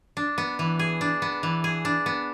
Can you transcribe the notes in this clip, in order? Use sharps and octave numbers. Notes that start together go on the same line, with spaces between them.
D4
B3
E3
G#4
D4
B3
E3
G#4
D4
B3